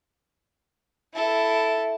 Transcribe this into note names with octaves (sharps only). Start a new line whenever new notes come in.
E4 A4